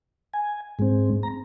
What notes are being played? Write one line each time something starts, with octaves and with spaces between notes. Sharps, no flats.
G#5
G#2 G#3 C4
A#5